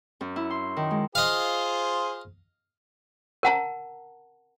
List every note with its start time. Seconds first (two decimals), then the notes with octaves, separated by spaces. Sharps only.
0.21 F#2
0.36 E4
0.50 C6
0.77 D#3
0.91 G#3
1.15 F4 G#4 C5 D#5 F5
3.43 A#4 F#5 A5 A#5